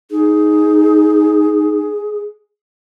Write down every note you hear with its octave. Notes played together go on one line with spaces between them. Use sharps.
D#4 G#4